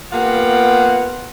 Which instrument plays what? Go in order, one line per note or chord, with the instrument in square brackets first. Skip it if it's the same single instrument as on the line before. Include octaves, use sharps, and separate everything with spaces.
[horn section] A#3 B3 F4 G4 F#5